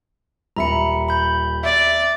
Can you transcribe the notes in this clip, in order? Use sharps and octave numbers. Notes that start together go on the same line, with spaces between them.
D#1 E5 A#5 B5 C#7
B5 G6
D5 E5